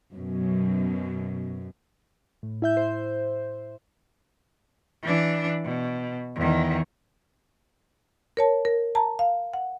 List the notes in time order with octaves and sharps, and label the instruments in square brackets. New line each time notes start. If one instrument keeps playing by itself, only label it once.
[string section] F#2 B2
[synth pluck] A2
E4 E5 G6
C5
[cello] E3 D4
B2
E2 D#3
[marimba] A#4 C#5 A5
A#4
A5 A#5
F5
F#5